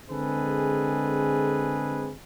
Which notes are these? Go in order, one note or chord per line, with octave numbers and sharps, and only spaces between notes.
D3 G#3 C4 G#4 A4 B4